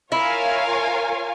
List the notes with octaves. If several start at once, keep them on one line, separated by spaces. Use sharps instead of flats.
E4 F4 A#4 C#5 F5 G#5